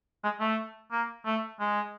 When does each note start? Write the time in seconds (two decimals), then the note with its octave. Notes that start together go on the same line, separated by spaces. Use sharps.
0.24 G#3
0.40 A3
0.91 A#3
1.25 A3
1.60 G#3